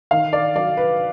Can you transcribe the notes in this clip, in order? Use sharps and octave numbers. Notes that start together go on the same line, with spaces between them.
D#3 F5
D5
F#3 D5
B4